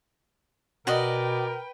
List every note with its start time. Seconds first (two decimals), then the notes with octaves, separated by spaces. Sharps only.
0.87 B2 F#4 A#4 B4 D5 D#5 G5